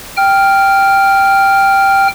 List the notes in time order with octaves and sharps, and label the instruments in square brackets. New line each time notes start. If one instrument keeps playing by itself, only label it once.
[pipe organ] G5 F6